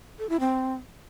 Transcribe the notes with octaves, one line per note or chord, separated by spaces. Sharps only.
A4
E4
C4